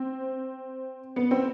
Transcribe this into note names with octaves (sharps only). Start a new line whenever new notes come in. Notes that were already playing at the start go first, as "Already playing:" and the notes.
Already playing: C4
B3
C4